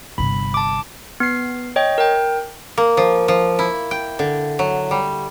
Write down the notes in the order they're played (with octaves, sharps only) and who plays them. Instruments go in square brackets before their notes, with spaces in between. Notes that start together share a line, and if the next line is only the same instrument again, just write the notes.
[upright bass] G1 C3 [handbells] B5
[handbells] A5 D6
B3 C7
C#5 D#5 G5
A#4 G5
[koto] A#3
F3
F3
E4
G5
D3
F#3
G3